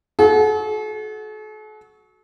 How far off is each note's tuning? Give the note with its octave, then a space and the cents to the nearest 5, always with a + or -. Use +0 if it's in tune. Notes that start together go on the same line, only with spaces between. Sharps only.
F#4 +0 A4 -45